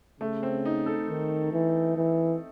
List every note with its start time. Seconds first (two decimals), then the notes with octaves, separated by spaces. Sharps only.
0.21 C#3 A3
0.43 C4
0.65 D#4
0.86 A4
1.09 D#3
1.53 E3
1.97 E3